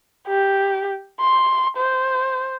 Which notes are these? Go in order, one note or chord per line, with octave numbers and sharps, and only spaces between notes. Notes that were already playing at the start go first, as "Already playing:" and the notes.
G4
C6
C5